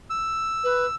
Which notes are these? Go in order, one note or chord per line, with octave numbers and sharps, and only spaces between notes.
E6
B4